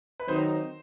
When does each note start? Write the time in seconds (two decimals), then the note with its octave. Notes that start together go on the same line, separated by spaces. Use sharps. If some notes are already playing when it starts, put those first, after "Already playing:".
0.20 B4
0.28 D#3 F#3 C4 D#4 C5